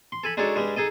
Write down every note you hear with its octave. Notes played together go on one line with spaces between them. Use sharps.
C6
A4 G#5 B5
G#3 D4 D#4 F#4 A4 C#5
G2 G3 G#3
D#4 G#4 A4 D#5